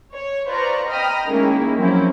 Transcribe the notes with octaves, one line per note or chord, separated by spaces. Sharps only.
C#5
F4 B4 C5 D5 A#5 C#6
D#5 G5 A#5 B5 D#6 F6
D#3 G#3 A#3 C#4 E4
F3 F#3 A#3 C4 C#4 E4